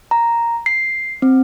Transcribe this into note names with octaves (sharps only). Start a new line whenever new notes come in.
A#5
C7
C4